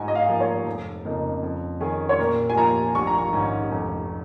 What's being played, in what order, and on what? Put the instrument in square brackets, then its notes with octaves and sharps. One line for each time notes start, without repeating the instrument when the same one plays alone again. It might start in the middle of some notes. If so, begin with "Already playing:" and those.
Already playing: [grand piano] G#2 [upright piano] G#5
[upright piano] D#5
F5
[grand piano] F3 A#3
[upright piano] C#5
[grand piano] F1
F2 C#3 A#3 D#4
F2
D#3 C#4 G#4
[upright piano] C#5
[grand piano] A#2 [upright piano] A#4
[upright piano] G#5
[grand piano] F3 A#3 F4 [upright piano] A#5
[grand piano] A#1 [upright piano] C#6
[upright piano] A#5
C#6
[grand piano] G#2 D#3 C#4
F1